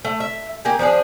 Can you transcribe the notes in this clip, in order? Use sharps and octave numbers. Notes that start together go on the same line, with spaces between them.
A3
E5
A#3 G4 G#4 G#5
F3 C4 D4 G#4